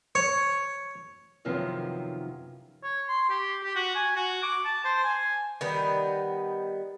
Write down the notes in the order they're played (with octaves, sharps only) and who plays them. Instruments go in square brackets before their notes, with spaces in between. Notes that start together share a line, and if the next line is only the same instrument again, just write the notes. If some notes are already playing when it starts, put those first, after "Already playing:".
[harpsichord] C#5
[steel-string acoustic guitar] F#2 C3 D#3 F3 F#3 B3
[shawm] C#5
C6
G4
G4
F#4
G#5
F#4
D6
A5
C5
G#5
[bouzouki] D#3 G3 B3